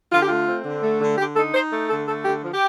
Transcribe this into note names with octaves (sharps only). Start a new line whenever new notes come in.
D3 F4
G4
A3 F4
C4
D3
A3
D3
D3 G4
D#4 A4
D#4 C5
A3
D3 A4
A3 A4
D3 G4
F3
G4